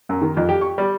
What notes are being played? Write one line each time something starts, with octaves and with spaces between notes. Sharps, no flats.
F#2
D#3
F2
G4
C#6
G3